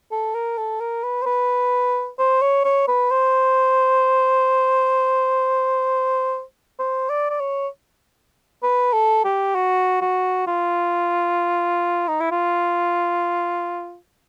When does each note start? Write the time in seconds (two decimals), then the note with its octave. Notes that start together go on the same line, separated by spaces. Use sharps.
0.11 A4
0.35 A#4
0.58 A4
0.80 A#4
1.03 B4
1.22 C5
1.26 B4
2.19 C5
2.42 C#5
2.64 C#5
2.88 B4
3.11 C5
6.79 C5
7.09 D5
7.30 D5
7.40 C#5
8.63 B4
8.93 A4
9.24 G4
9.55 F#4
10.01 F#4
10.47 F4
12.08 D#4
12.20 E4
12.31 F4